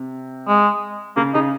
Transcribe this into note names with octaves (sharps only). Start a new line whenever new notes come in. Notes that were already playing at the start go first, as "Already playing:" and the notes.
Already playing: C3
G#3
C#3 A#3
C#3 D#4